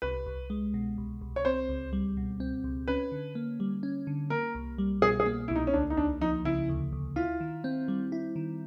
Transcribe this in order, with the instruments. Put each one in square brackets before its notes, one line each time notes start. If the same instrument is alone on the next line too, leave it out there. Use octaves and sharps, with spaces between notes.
[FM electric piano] C2 [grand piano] B4
[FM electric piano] C2
G#3
B2
C2
C2
[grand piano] C#5
[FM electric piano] C4 [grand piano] C5
[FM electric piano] C#2
G3
B2
C4
C#2
[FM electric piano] C#4 [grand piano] B4
[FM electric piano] D3
A#3
G3
C#4
D3
[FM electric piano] A#3 [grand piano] A#4
[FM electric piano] C2
G3
[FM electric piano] B2 [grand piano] G#4
[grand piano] G#4
[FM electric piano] A#3
[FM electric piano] C2 [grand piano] E4
[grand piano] D#4
C#4
[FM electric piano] D2 [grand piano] D4
[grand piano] D#4
[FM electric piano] D2 [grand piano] D4
[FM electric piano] F3 [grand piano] D#4
[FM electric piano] C#3 [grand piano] E4
[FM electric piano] D2
D2
[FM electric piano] E4 [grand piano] F4
[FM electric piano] D#3
C4
G3
E4
D#3